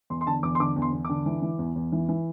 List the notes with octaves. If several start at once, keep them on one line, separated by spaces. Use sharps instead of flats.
E2 C6
C6
D3 A5
E2 D6
C6
D3 D6
E2
C6
E2
D3 D6
E3
E3
E2
E2
E3
E3